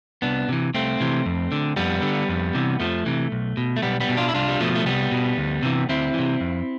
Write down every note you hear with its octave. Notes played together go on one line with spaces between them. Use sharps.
C2 B3 D4
C3 E3
C2 A3 C4
C3 E3
F2
D3
F2 G3 B3
D3
F2
C3 E3
F2 F3 A3
C3 E3
B1
B2
A3
B1 G3 B3
G3 B3
B2
D4 F4
E4
C2 D4 F4
G3
B2 F3 A3
A3
C2 G3 B3
B2
D2
C3 E3
D2 C4 E4
E3
C3
F2